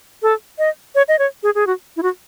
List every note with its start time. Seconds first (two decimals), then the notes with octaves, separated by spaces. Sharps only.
0.22 A4
0.59 D#5
0.95 C#5
1.08 D#5
1.19 C#5
1.43 G#4
1.55 G#4
1.67 F#4
1.97 E4
2.03 F#4